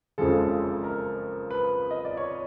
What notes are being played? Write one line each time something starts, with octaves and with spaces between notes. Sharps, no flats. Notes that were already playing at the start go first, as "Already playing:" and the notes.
F#1 F2 C#3 F3 G#3 A4
A#4
B4
D#5
D5
C#5